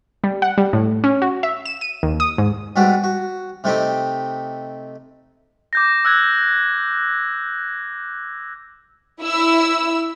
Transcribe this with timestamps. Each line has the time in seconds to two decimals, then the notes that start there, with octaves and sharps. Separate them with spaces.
0.24 G3
0.42 F#5
0.58 G3
0.73 A2
1.04 C#4
1.22 F#4
1.43 E5
1.65 E7
1.81 D#7
2.03 D#2
2.20 D#6
2.38 G#2
2.76 G#2 G3 B3 F#4 D5
3.04 F#4
3.64 C3 A3 C4 D#4 G4
5.73 D6 G6 A#6
6.05 E6 F#6 G#6
9.21 E4 E6